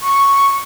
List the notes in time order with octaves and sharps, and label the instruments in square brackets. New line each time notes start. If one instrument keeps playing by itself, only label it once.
[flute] C#6